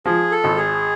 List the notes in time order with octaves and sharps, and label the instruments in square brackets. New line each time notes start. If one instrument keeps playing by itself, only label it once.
[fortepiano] F3 [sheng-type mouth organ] G#4
[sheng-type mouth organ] A4
[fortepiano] G#1
[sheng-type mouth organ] G#4